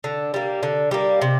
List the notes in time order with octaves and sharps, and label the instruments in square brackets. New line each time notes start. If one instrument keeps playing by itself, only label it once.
[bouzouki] D3
G3 A#3
D3
G3 A#3
C3